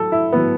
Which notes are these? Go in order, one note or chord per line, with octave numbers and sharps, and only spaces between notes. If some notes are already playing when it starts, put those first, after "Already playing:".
Already playing: A2 F#3 A4
E4
A2 F#3 B3